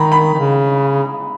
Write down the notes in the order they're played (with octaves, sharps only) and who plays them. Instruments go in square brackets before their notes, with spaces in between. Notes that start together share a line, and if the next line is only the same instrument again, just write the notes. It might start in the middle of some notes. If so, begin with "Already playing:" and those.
Already playing: [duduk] D#3 [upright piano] A#5 B5
[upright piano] B5
[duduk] D#3
C#3